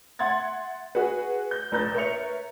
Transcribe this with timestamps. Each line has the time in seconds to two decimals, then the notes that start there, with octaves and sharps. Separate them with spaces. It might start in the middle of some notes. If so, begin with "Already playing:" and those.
0.19 E5 F#5 C6 G#6 A6
0.95 F#4 G#4 B4
1.51 G6
1.71 F1 A#1 B4 A#5 G6 A6
1.95 A#4 B4 C#5 E5 C#7 F7